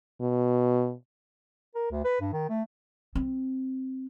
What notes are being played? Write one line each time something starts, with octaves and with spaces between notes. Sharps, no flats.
B2
A#4
D2
B4
G2
D#3
A3
C4